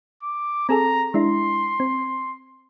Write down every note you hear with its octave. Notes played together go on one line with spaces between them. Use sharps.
D6
C4 G#4 A4 A#5
G#3 D4 E4 C6
C4